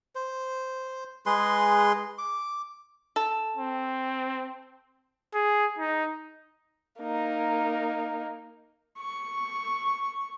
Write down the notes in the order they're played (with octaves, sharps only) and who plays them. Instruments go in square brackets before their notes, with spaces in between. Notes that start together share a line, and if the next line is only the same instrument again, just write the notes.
[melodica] C5
G#3 G#4 B4 C6
D6
[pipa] A4
[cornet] C4
[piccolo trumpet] G#4
D#4
[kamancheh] A#3 D#4
[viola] C#6